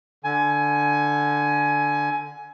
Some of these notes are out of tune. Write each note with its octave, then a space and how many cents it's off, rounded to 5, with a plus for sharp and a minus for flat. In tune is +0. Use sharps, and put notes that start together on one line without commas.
D3 +0 G#5 +20